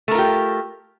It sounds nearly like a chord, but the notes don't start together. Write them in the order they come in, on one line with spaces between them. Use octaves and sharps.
A3 A#4 F4 G4